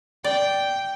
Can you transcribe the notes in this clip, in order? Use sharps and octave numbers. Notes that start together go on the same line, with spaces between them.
D5 G5